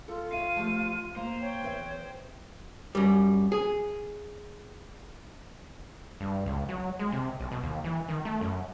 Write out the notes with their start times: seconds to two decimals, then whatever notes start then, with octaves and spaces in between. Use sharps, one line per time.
0.08 F4 A4
0.32 C#5 E5 F5 D#7
0.56 F3 A3 G4
1.16 A#3 C5 A#5
1.41 C#5 G5
1.62 E2 B4 E5
2.95 F#2 G3
3.52 G#4
6.20 G2
6.46 C#2
6.69 F#3
6.99 G#3
7.12 C3
7.40 B1
7.52 B2
7.63 D#2
7.84 E3
8.08 D#3
8.25 A3
8.41 F#2